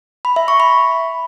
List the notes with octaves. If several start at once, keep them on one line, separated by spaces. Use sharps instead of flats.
B5
E5
C#6
B5